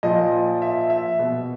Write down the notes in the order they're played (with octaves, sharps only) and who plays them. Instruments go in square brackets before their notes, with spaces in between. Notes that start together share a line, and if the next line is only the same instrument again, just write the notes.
[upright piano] A#2 F3 D#5
E5
E5
B2